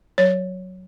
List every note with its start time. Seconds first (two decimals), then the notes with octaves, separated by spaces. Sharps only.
0.18 F#3 C#5